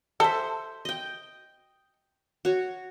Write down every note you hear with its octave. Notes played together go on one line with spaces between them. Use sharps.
A4 C5 E5
D#5 G5
F#4 C#5